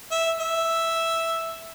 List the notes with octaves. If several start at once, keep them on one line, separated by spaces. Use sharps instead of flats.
E5
E5